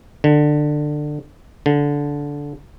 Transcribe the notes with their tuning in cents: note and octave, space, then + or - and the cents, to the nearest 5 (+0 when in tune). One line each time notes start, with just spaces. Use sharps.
D3 +20
D3 -15